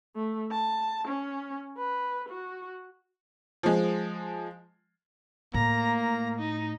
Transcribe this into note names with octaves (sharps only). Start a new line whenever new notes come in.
A3
A5
C#4
B4
F#4
F3 G#3
A2 A#3 A#5
A#5
D#4